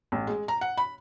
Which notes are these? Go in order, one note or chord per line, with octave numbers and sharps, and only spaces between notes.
A1
G#3
A#5
F#5
B5